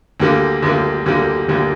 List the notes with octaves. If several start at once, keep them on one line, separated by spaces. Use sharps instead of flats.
D2 D3 G3 A#3
D2 D3 G3 A#3
D2 D3 G3 A#3
D2 D3 G3 A#3